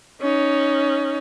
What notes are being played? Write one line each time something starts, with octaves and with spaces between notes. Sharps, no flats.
C#4 D#4